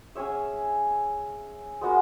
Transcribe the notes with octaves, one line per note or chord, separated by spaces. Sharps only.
C#4 G#4 C#5 E5
G#3 B3 F#4 A#4